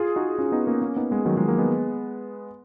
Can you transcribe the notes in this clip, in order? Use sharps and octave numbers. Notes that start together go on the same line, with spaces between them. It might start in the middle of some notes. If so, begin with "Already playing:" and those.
Already playing: F4 G#4
D#4 F#4
C#4 F4
B3 D#4
A#3 C#4
A#3 C#4
B3 D#4
G#3 B3
D#3 F#3
F3 G#3
F#3 A#3
G#3 B3